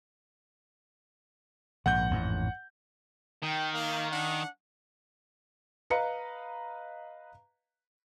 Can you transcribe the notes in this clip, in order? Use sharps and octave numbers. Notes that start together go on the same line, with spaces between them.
A#1 G#2 F#5 G6
A1 F2 G#2
D#3 G5
A#3 F5
D4 F#5
B4 D#5 F5 A#5 C#7